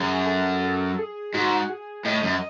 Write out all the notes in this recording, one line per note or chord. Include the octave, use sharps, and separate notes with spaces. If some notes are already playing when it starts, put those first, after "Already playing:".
Already playing: F#2 G#4
A4
A4
G#4
G#2 F#4
G#4
A2 D#5
F#2